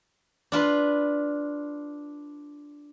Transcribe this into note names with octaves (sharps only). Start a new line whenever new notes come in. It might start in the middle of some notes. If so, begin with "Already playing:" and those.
D4 F4 B4